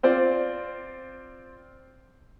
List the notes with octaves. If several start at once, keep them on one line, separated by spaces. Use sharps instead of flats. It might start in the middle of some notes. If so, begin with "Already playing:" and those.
C4 F4 C5 D5